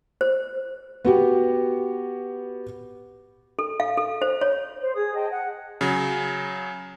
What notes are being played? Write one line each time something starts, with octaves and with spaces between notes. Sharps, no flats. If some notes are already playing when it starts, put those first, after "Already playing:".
C5
B3 F#4 G4
A4
F5
A4
C5
C#5
C5
G#4 D#6
D#5 G5 A5
F#5
C#3 F#3